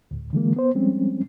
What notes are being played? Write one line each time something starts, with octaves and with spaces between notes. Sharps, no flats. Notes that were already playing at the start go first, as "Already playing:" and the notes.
D2 A2
D3 E3 G#3 A#3
B3 C5
F3 G3 G#3 C4 C#4